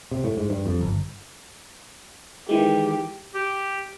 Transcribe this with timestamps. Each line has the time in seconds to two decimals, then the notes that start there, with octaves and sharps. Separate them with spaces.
0.11 C3
0.24 A2
0.38 G#2
0.50 G2
0.66 F2
0.81 G1
2.49 D#3 E3 G#3 G4
3.35 G4